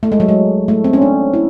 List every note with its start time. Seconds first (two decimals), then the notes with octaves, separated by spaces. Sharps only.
0.03 A3
0.12 G#3
0.20 F#3
0.28 G#3
0.68 A3
0.84 C4
0.93 C#4
1.02 D4
1.34 E4